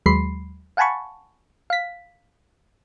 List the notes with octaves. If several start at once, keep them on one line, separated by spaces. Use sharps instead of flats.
D#2 F#3 G#3 B5 C6 C7
F5 F#5 G#5 A5 B5 C#6
F5 B6